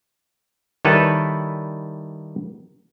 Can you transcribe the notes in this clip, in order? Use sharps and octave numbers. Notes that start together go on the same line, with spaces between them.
D#3 G3 E4 A4 B4 C#5